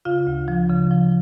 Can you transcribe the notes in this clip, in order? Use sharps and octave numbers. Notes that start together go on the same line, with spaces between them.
C#3 F4 F5
D2
F3
C#3
F3